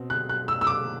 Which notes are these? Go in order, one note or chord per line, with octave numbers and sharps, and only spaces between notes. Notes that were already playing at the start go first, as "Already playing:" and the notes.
Already playing: B2 C4
F#6
F#6
E6
E6
D6